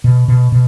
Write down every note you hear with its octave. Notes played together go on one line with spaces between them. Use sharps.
B2
B2
B2